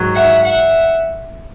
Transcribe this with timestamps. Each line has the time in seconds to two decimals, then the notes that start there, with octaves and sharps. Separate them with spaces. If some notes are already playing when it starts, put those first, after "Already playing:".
Already playing: G#2 D#3 F#3
0.15 E5 F#5
0.44 E5 F#5